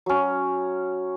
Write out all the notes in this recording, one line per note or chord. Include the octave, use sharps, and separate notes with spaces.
F#3 C#4